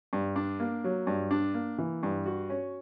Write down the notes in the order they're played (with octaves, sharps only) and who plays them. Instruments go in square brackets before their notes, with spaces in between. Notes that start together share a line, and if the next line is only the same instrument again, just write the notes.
[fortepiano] G2
D4
A#3
F#3
G2
D4
A#3
E3
G2
F#4
C#4